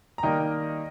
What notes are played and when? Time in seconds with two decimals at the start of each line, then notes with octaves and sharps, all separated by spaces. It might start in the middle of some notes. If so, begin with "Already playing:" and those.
0.18 A#5
0.23 D#3 G3 A#3 D#5 G5